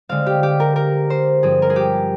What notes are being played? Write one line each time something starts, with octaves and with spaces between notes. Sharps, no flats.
D3 G#3 C4 F5
G4
G4
A#4
A#4
C5
G2 F3 C4 G#4
A#4
G#4
G4